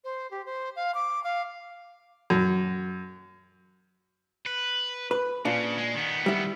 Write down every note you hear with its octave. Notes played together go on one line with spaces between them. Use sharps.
C5
G4
C5
F5
D6
F5
F#2
B4
B4
A#2 C#3 D4
G#3
D#3 B3
G3 E4